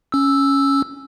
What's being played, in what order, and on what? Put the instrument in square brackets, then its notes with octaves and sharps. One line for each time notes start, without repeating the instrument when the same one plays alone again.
[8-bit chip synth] C#4 E6